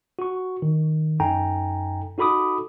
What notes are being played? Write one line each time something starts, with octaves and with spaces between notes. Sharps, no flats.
F#4 C#6
D#3
F#2 D#4 A4 G5 G#5 A#5
D#4 F#4 A4 B5 D6 D#6